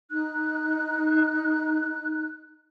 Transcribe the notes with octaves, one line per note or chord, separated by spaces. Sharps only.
D#4 F#6